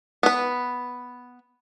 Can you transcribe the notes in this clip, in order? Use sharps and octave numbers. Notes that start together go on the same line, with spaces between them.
B3 B4